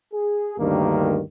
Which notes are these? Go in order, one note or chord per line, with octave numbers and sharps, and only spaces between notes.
G#4
D2 G2 D#3 G3 A#3